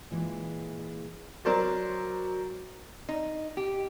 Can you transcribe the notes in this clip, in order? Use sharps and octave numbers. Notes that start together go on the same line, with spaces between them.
A#2 E3 G#3
F#3 A#4 C5 D5
D#4
G4